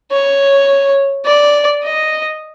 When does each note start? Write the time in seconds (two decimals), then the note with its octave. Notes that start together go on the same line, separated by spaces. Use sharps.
0.12 C#5
1.26 D5
1.83 D#5